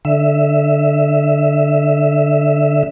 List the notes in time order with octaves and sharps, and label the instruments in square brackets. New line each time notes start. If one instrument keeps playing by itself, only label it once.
[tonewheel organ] D3 E5